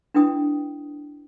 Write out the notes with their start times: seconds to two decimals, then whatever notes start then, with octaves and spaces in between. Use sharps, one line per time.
0.14 D4 E4 B4 G5 D#6